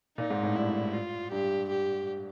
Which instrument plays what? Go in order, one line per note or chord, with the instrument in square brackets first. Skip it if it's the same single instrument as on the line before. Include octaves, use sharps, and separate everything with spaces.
[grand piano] A#2 [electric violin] D#4
[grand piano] G#2
A2
[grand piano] G2 [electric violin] E4
[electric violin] F4
[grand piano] G2 [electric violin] G4
[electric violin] G4